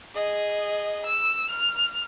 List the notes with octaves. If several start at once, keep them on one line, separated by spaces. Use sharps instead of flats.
G#4 D#5
E6
F6